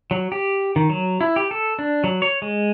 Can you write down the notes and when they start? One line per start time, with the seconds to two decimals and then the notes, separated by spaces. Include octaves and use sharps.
0.11 F#3
0.32 G4
0.76 D#3
0.90 F#3
1.21 E4
1.36 G4
1.51 A4
1.79 D4
2.04 F#3
2.22 C#5
2.42 G#3